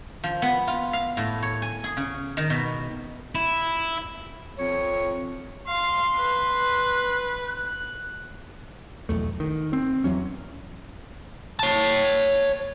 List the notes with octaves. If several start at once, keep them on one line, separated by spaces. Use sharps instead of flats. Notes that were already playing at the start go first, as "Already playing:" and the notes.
F3
B3
F4
F5
A2
C#5
G#5
G#4
C#3
D#3
B2
E4
F2 C#5
F5 C6
B4
F#6
B1 E2 A3
D#3
C4
E2 E3 F#3 C#4
C#5 A5